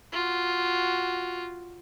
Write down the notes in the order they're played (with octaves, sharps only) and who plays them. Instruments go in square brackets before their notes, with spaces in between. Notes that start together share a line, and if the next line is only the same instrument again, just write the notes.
[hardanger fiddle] F4 F#4